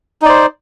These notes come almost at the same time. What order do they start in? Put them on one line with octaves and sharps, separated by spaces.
D#4 D5 C5